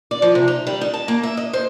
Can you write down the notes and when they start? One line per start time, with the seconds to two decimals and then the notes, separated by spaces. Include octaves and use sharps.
0.11 D5
0.22 F3
0.35 C3
0.48 D#4
0.67 G3
0.81 D#4
0.94 A5
1.08 A#3
1.23 E5
1.37 D#5
1.53 C5